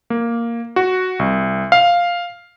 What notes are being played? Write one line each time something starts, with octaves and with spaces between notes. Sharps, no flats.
A#3
F#4
C2
F5